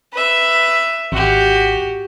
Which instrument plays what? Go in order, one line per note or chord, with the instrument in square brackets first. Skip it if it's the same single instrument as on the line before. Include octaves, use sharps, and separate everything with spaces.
[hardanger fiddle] B4 E5
[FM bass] G#1 [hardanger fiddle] F#4 G4